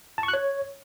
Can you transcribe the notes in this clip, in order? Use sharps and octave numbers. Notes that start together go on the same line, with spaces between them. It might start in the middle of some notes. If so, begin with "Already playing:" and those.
A5
C#6
F#6
C#5